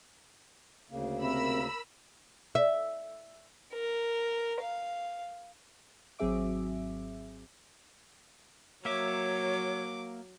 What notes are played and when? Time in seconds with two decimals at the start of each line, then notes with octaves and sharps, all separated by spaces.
0.91 D2 C#3 A#3
1.22 C3 A#4 B5 E6
2.55 E5
3.73 A#4
4.61 F5
6.19 G#1 F#3 C4 G#4 E5 D6
8.85 F#3 A#3 C#5 E5 D6